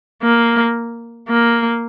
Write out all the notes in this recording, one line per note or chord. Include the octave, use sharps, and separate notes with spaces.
A#3
A#3